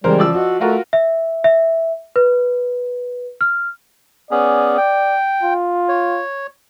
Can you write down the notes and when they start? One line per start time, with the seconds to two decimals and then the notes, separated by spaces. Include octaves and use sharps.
0.04 C#3 E3 G3 G#3 A#4 C5
0.19 F3 D5 E6
0.35 F#4 D#5
0.61 A3 F4 F#4 A#4
0.93 E5
1.44 E5
2.16 B4
3.41 F6
4.31 B3 C#4 G#4 D5
4.77 G5
5.43 F4
5.89 C#5